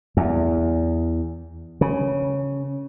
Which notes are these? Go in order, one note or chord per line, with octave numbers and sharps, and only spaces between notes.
E2
C#3